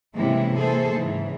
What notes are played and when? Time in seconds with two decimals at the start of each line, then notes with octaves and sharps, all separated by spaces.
0.15 C3 E3 G#3 A#3 C#4 E4
0.59 E3 A#3 G#4 A4 C5
0.94 G#2 C#3 E3